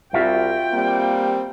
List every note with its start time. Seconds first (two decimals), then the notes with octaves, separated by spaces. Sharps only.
0.14 C2 F4 F#4 E5 G5
0.73 G3 A#3 C4